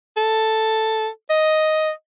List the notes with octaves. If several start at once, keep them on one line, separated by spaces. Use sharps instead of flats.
A4
D#5